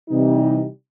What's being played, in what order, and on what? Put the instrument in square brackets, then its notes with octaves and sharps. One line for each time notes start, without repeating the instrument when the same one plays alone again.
[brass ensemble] C3 E3 G3 D#4